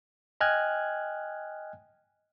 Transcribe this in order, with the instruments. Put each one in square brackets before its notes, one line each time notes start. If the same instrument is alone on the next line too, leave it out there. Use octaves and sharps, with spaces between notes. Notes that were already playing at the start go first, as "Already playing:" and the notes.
[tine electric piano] D#5 G5 G#5 F6 F#6 G#6